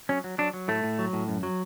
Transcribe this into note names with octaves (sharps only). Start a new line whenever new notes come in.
F#3 C#4
F#3
F#3 D4
F#3
A2 A3
A2
F#3
A2
F#2
F#3